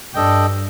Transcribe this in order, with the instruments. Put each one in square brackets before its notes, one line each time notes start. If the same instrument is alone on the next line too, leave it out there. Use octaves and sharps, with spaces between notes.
[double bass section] G2 [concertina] D4 A4 D#5 G5